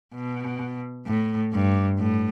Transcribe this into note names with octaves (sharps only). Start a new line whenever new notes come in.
B2
A2
G2
A2